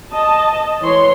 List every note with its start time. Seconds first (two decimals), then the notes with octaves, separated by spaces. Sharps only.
0.12 D#5 A5
0.82 E3 C#5 C6